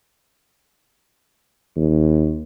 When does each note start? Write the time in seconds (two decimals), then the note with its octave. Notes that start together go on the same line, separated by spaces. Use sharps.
1.76 D#2